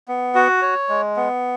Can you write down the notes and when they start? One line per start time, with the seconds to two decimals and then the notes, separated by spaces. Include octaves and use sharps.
0.08 B3
0.35 F#4
0.62 C#5
0.89 G#3
1.16 B3